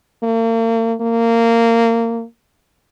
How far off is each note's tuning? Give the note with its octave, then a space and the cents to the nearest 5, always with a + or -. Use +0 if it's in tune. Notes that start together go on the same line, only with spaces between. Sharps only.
A#3 -40
A#3 -20